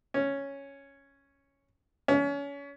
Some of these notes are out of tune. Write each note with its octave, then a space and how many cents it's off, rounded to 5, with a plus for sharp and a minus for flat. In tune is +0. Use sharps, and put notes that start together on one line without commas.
C#4 +0
C#4 +30